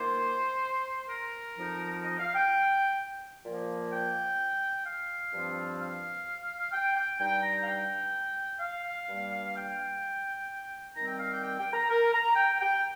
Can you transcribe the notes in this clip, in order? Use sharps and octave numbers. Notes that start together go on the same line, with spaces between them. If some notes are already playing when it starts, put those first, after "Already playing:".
Already playing: D#3 A#3 F4 C5
A#4
F2 F3 D#4
D#5
F5
G5
A#2 F3 A#3
G5
F5
G2 F3 C4 F4
F5
G5
G5
G2 G3 D#4 G5
A#5
F5
G5
F5
G2 G3 A#3
G5
D#3 G3 C4 A#5
G5
F5
G5
G5
G5
A#5
A#4
A#5
G5
G5